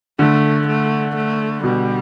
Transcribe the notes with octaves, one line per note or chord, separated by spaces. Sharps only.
D3 A3
A3
A3
B2 G3